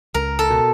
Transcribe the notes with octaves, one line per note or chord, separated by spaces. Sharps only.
C#2 A#4
A4
B2